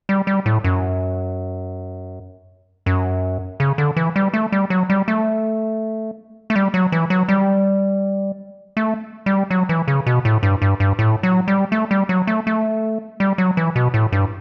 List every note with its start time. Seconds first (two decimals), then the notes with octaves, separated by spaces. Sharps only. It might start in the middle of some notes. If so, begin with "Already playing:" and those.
0.09 G3
0.27 G3
0.46 A2
0.64 F#2
2.86 F#2
3.60 C#3
3.78 D3
3.97 E3
4.16 G3
4.34 A3
4.52 G3
4.70 F#3
4.90 G3
5.08 A3
6.50 A3
6.56 G3
6.74 F#3
6.92 E3
7.10 F#3
7.28 G3
8.77 A3
9.26 G3
9.51 F#3
9.69 E3
9.88 C#3
10.06 B2
10.25 A2
10.43 G2
10.62 G2
10.80 G2
10.99 A2
11.23 F#3
11.48 G3
11.72 A3
11.91 G3
12.09 F#3
12.27 A3
12.47 A3
13.20 G3
13.38 F#3
13.57 E3
13.76 B2
13.94 A2
14.12 G2